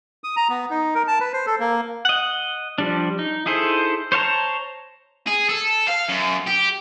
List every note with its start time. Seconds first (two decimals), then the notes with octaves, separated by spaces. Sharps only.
0.24 D#6
0.36 A#5
0.50 B3
0.71 D#4
0.95 A#4
1.08 A5
1.20 B4
1.33 C5
1.47 A4
1.60 A#3
2.05 D#5 F#5
2.78 F3 G3 D4
3.19 D#4
3.46 D#4 E4 G#4 A4 C5
4.12 C5 C#5 F5 A5 A#5
5.27 G#4
5.49 A4
5.88 F5
6.08 F#2
6.47 G4